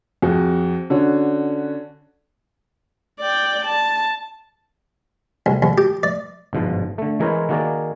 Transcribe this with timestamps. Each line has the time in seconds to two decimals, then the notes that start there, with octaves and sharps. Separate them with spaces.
0.22 F2 F#4 G#4
0.90 D3 C#4 F#4
3.21 D5 G5
3.66 A5
5.46 C2
5.62 D#2
5.78 G4
6.03 D5
6.53 G1 G#2 B2 F3
6.98 D3 A3
7.20 E3 G#3 E4 A#4 C5 C#5
7.49 D#3 A#3 F#4 G#4 A#4 D5